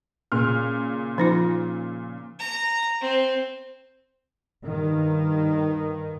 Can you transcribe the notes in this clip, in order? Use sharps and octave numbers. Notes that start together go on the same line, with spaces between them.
A#2 C#3 F6
F3 D#4 F4
A#5
C4
G2 D#3